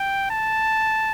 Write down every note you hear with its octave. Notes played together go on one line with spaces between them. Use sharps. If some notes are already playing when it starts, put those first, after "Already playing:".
Already playing: G5
A5